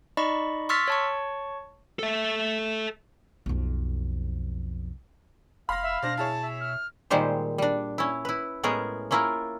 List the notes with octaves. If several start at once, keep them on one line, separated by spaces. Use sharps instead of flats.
D#4 D5 D#5 B5 C#6
C6 C#6 E6 F6 A6 B6
C#5 A5 C#6
A4 E5
B1 F2
F1 F5 B5 C6 A#6
E5
B2 D4 C5 D5 A#6
E4 G#4 C#5 A5
E5
F6
A#2 D#3 G3 G#3 G4 C5
G3 D4
C#4 E4
E4 B4
A2 G#3 B3 C#4 G#4 A#4
A#3 C#4 E4 F4 A#4